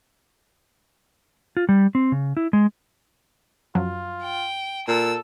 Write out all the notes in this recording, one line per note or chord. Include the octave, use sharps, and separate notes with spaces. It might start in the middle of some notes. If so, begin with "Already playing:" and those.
F4
G3
C4
C#3
E4
G#3
F#2 F3 F#3 F4
G5
A#2 A4 E6